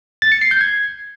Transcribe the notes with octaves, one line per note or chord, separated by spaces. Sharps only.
A6
C#7
C7
G6
G#6